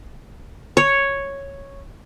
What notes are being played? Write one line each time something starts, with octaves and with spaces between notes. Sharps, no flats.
C#5